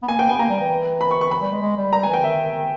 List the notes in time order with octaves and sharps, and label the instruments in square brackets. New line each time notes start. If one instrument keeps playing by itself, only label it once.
[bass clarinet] B3
[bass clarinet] A#3 [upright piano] G#5
[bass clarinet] A#3 [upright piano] G5
[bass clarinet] B3 [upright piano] G#5
[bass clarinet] A#3 [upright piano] A#5
[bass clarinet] G3
E3
[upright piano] B5
C#6
C#6
[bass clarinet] E3 [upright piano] B5
[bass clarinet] G3
G#3
G#3
G3
[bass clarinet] G3 [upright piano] A#5
[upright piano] G#5
[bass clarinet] E3
[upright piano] G5
[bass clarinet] D#3 [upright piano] E5
[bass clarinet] D#3